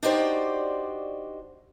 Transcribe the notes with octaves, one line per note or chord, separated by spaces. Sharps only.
D4 D#4 F#4 G4 C5 D5